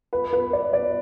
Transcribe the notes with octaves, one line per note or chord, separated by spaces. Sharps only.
B4
B4
D5
D5